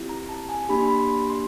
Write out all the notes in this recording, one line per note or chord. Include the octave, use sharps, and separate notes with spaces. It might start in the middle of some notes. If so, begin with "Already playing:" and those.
Already playing: C4 E4 G4
A#5
A5
G#5
A#3 D4 G4 B5
C6
B5
C6
C6